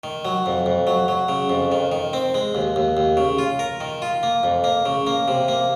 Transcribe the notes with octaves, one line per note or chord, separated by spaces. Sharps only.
D#3
F#3
F2
F2
F#3
F#3
C#3
F2
D#3
D#3
C4
G#3
D#2
D#2
D#2
C#3
F4
A#4
D#3
F4
A#3
F2
A#3
C#3
A#3
C3
A#3